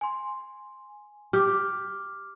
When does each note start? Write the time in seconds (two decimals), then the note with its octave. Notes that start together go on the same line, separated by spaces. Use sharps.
0.01 G#5 C6
1.33 G4 D6 F6